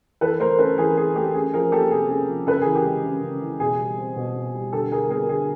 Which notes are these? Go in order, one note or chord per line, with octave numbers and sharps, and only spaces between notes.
E3 A4 B4
A3 A#4 C5
C#4 A4 B4
E3 G#4 A#4
E3 G#4
A3 G4 A4
C#4 G#4
F3 G#4 A#4
A#3 G4 A4
C3 G#4
C#4 G#4
F3
C#3 A4 B4
G#4 A#4
E3
G4
G#3
C#3
C#3
E3
B2 G#4
G3
C4
B2
B2
G3
D3 G4 A4
G3 G#4 A#4
B3 G#4 A#4
D3 G#4